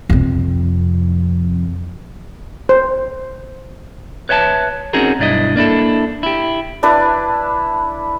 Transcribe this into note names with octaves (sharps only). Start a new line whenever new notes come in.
F2 C3
C5
B4 C#5 E5 G5 A5
C4 C#4 D#4 F#4 G#4 A#4
B1 G2 D4 E4 D#5
A#3 D4 E4 A4
E4 G4
D4 E4 B4